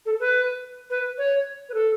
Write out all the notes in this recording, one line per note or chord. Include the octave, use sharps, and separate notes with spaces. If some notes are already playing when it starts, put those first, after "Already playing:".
A4
B4
B4
C#5
B4
A4